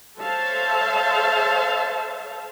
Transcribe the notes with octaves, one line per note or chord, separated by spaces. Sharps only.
A4 C5 C#5 E5 F5 A5